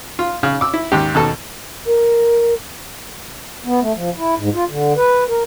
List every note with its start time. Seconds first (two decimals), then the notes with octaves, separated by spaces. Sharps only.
0.19 F4
0.43 C#3
0.61 D6 E6
0.74 E4
0.92 D#2 G#2 G4
1.14 D#2 B2 A4 A5
1.87 A#4
3.65 B3
3.82 A3
3.95 F3
4.17 E4
4.37 G#2
4.54 F4
4.69 D3
4.96 B4
5.28 A#4